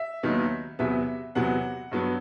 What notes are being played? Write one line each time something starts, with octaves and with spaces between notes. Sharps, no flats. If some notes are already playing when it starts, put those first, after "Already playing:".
Already playing: E5
D#2 D#3 F#3 B3
E2 C3 F#3 B3 E5
E2 C3 F#3 B3 F#5
G2 F#3 B3